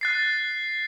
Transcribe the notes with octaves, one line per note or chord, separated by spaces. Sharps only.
F#6 A6 C7